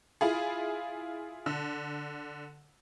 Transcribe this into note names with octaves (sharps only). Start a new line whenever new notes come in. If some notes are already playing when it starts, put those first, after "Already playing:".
E4 F4 G#4
D3